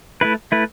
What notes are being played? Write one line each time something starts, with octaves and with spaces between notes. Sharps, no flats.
A3 E4 B4
A3 E4 B4